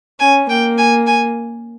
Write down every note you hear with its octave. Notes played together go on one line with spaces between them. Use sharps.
C#4 G#5
A#3 G5
G#5
G#5